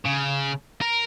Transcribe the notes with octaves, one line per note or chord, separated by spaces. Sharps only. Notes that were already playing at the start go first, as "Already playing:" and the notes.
C#3
A#4